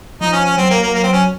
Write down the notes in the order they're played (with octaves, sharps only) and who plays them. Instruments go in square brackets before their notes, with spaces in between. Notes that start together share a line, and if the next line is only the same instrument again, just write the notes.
[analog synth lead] F3 [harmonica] D#4
[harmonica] C#4
C#4
[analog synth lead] F#3 [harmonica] C4
[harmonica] A#3
A#3
A#3
C4
C#4